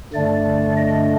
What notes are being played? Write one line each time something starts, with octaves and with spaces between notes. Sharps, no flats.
G2 D3 A3 D4 D5
D#5